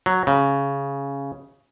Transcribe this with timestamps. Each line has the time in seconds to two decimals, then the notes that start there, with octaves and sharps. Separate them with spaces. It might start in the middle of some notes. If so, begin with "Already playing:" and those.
0.06 F#3
0.27 C#3